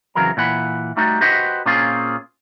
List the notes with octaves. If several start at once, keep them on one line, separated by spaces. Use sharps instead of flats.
F2 C#3 E3 F#3 A#4 A#5
A#2 E3 F#5 B5
G3 A3 D#4 F#4
F#4 G4 B4 C5 D#5 F#5
A#2 A#3 C4 C#4 F4 G#4